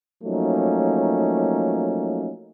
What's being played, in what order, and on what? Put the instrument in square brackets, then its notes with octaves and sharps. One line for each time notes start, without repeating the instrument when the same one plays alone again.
[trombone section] F3 F#3 A3 A#3 C#4 D#4